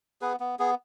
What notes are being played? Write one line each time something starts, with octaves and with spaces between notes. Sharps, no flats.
B3 G#4 B4
B3
B3 G#4